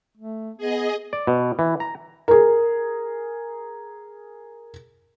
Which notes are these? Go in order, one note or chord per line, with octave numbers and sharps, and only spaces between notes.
A3
B3 G#4 D#5
D5
B2
E3
A#5
G#4 A#4